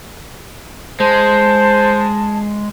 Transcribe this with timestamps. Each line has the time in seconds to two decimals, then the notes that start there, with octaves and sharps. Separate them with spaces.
1.00 G#3 C5 A5